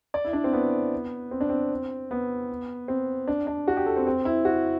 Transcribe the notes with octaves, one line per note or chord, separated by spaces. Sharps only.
D5
E4
D4
C4
B3
C4
D4
C4
B3
C4
D4
D4
F#4
G4
A4
C4
C4
E4
F#4